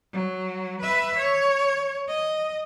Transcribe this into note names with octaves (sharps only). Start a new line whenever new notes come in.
F#3
B4 E5
C#5
D#5